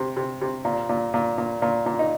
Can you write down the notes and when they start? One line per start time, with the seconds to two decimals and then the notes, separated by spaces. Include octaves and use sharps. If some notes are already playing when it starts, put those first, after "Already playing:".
Already playing: C3
0.17 C3
0.41 C3
0.65 A#2
0.89 A#2
1.14 A#2
1.38 A#2
1.62 A#2
1.86 A#2
1.99 D#4